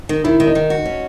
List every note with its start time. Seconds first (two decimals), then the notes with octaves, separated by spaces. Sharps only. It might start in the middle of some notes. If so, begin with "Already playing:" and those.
0.09 D#3
0.24 D#3 E4
0.40 D#3
0.47 D#4
0.55 D#3
0.70 F#4
0.85 C#4